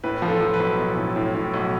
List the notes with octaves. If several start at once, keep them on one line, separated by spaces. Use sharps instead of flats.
A2 B4
F3
A4
F3
B4
B1
B1
A2
A2
A2
B1